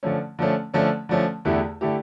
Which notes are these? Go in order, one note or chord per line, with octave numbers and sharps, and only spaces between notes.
D3 F3 A3 C#4
D3 F3 A3 C#4
D3 F3 A3 C#4
D3 F3 A3 C#4
E2 D3 A3 E4 G4
D3 A3 E4 G4